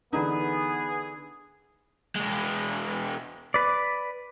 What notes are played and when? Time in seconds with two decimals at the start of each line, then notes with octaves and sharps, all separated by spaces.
0.13 D3 E3 B3 D#4 G#4
2.16 E2 G#3
3.54 B4 D5